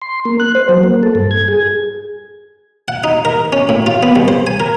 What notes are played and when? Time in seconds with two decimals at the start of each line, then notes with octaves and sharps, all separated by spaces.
0.02 C6
0.25 A#3
0.40 F#6
0.55 C5
0.69 F#3
0.83 A#3
1.03 A4
1.15 G2
1.31 G#6
1.48 G#4
2.88 F#5
3.04 D#4
3.25 A#4
3.53 C#4
3.69 A2
3.86 F4
4.03 B3
4.16 C2
4.28 C5
4.47 G#5
4.60 A#4